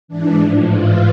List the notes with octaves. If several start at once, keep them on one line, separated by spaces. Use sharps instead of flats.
G#2 E3 D4
A2 F3
G#2 E3 F4